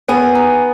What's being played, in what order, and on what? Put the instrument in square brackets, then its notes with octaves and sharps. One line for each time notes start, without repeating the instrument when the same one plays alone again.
[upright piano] B3 [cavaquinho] G#4
[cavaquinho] D#4